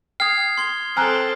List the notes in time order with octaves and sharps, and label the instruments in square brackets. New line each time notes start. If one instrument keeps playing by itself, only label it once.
[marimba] G5 [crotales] D#6 C7 [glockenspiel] F6 G#6
[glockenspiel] C6 G#6 G7
[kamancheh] C4 A4 [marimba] G#5 A#5 F#6 [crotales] F6